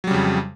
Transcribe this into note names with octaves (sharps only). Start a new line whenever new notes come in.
F2 C#3 F#3 G3